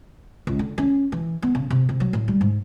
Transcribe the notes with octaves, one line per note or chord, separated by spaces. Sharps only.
C#2
D3
C#4
E3
B3
C#3
C3
C3
F#3
A2
G3
G#2